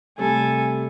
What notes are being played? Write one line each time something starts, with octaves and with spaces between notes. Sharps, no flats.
C3 G3 A3 A4 G#5